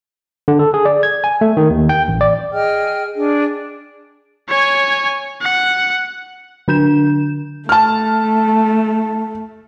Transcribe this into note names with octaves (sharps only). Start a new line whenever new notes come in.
D3
A4
G#4
D5
G#6
G#5
A3
D#3
D#2
G5
A1
D5
G#4 D#5 G5 F6
D4 G#4
C#5 G#5
F#5
D3 D4 G6 E7
A3 A5 F6